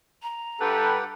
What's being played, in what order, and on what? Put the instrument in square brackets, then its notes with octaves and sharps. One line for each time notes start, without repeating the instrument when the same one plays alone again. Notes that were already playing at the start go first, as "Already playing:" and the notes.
[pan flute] A#5
[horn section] G2 B4 [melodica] G4 F#5 G5 [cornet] A4